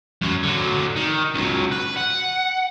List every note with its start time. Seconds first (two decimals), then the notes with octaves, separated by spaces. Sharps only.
0.22 F#2 F#3
0.43 D3 F#3
0.96 D#3
1.35 C#2 F#3
1.72 B4
1.97 F#5